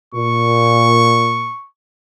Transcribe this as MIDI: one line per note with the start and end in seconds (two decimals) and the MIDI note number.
0.14 1.50 46
0.14 1.67 85